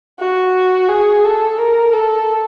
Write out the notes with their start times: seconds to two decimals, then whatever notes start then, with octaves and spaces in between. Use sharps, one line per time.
0.20 F#4
0.89 G#4
1.24 A4
1.59 A#4
1.93 A4